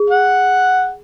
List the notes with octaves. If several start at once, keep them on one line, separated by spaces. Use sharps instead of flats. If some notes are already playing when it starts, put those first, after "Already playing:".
Already playing: G#4
F#5